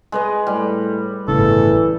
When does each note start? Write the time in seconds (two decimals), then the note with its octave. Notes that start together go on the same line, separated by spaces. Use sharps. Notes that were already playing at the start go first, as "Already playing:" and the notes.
0.12 G#3 B4 D#5
0.47 A2 G3
1.28 G1 A2 C#3 E3 A4